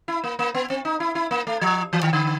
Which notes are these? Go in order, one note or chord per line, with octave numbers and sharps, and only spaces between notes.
E4
A#3
A#3
B3
C4
D#4
E4
E4
A#3
A3
F3
E3
D#3
D3